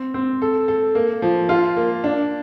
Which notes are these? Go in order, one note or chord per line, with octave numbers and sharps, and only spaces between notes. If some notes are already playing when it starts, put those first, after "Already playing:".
Already playing: C4
C4
A4
A4
A#3
F3
F4
A#3
D4